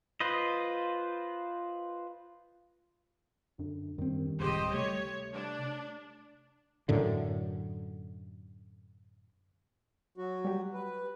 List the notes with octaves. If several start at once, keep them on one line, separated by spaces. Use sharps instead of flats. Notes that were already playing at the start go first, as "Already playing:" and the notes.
F4 B4 C5 D#5
F#2 D3
F#2 D#3 G3 C4
D1 C#2 G4 C5 D#5
C3 A3 C#5
D4
F#2 A2 D3
F#3 F#4
G3 G4
B4